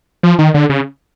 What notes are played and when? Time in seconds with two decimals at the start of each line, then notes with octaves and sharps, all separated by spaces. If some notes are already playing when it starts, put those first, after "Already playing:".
0.23 F3
0.39 D#3
0.54 D3
0.70 C#3